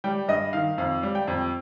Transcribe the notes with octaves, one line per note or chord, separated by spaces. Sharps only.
G3 G5
G2 D#5
D#3 F5
F2 F5
G3
G5
F2